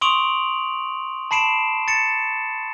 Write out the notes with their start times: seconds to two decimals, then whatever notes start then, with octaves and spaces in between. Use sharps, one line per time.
0.01 C6 C#6 D#6 D7 F7 F#7
1.31 A5 B5 C7 D7 E7
1.88 A6 C#7 E7